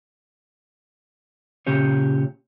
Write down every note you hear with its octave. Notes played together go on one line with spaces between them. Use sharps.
A#2 C#3 C#4 G4 C#5